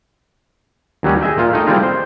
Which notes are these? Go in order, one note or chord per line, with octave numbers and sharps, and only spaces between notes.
D#2 F#3 G3 C#4
G#4 D#5 E5 G5
A#2 F4
A3 D#4 G5
G3 G#3 A#3 C4 E4 F4
C5